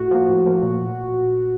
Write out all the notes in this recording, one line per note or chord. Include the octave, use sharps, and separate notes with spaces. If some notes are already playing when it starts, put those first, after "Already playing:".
Already playing: A2 F#4
F3 A#3
A2
F3 A#3
A#2